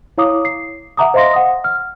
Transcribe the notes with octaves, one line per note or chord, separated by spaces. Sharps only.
E4 C#5 F5 A#5 D6 D#6
C7
E5 F#5 A#5 D6 D#6
C5 D#5 F5 C6 A#6
F#5 D#6
F6